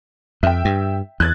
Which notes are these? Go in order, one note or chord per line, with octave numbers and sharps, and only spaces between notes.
F2 E5 G5
G2
E2 F#6 G#6 A6